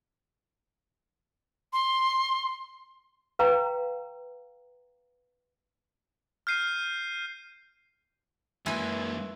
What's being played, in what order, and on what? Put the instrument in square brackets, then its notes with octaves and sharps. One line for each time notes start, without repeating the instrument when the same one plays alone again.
[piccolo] C6
[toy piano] B4 F5 G5 A#5
[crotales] F6 G6 C7 D#7
[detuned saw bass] F#2 [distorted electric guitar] E3 A#3 [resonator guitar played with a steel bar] G#3 G#5 [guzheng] E4 B4